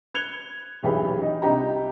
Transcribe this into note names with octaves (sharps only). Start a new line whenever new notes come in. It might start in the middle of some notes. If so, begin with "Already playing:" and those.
F#6 G#6 C#7 F7 G7
D#1 B1 E3 G4 G#4 B5
D#4
C2 C3 D4 D#4 G4 A#5